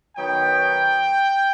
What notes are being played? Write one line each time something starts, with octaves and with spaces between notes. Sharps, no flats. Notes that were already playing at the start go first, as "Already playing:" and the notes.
D#3 F#3 B3 D#4 G5